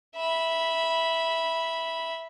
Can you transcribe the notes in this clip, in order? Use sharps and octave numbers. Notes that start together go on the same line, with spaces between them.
E5 B5